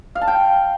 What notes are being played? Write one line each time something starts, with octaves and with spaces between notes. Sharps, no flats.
F5
A5
G5